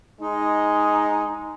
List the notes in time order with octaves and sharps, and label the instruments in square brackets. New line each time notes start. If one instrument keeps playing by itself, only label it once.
[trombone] G#3 [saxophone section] D#4